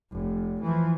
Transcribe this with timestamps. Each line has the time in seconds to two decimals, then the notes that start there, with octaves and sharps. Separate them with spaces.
0.12 F1
0.62 E3 F3